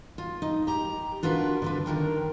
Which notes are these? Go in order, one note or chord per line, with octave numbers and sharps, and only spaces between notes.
F4
D#4
G4 A#5
D4 F4 F#4 A#4 B4
D3 D4 B4
D3 D#3 A#4 G5